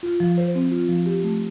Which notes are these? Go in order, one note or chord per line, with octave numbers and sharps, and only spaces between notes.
F4
F3
C5
C4
F4
F3
G4
A3